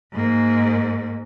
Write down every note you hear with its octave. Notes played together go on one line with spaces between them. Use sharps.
G#2 A#3